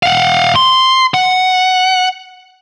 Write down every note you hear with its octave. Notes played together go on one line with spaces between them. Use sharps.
F5 F#5
C6
F#5